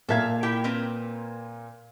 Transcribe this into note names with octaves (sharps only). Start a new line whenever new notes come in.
A#2 A#3 A4 E5 F5 G#6
E4 G4 G5
C4 A#4 B4